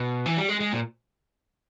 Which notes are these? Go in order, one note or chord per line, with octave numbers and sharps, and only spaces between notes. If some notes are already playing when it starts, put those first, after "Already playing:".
Already playing: B2
E3
G3
G#3
G#3
A#2